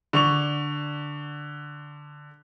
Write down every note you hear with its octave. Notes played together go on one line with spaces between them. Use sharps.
D3 C#6 F7